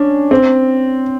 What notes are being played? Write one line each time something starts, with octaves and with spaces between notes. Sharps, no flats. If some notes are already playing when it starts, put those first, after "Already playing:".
Already playing: C#4 D4
C4